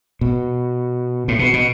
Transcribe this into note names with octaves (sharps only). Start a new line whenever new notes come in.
B2
A2
B2
B2